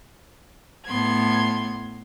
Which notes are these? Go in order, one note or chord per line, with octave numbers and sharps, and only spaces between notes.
A2 B3 C6 G#6